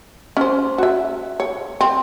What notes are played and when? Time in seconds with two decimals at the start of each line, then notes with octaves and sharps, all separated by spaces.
0.37 C#4 C5
0.78 F#4 E5
1.40 C#5
1.81 C4